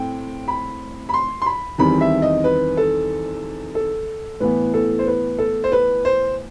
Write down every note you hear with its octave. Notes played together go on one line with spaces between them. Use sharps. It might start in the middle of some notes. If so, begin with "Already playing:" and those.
Already playing: A2 A3 C4 G5
B5
B5
C6
C6
B5
E2 D#3 G3 C4 B5
E5
D#5
B4
A4
A4
A2 E3 B3 B4
A4
C5
B4
A4
C5
B4
C5